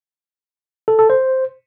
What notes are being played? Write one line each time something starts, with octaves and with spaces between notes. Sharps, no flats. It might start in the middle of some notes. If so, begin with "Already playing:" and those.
A4
A4
C5